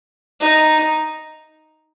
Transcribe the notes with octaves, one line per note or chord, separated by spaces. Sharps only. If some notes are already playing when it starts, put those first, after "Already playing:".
D#4